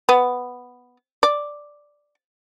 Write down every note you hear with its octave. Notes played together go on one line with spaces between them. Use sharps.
B3
D5